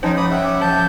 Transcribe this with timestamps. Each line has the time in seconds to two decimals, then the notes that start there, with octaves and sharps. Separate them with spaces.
0.03 C#3 F3 D#4 C5 G5
0.17 G#2 B5 D6 D#6
0.31 E5 F#5 G5
0.44 D6
0.61 F3 A5 G6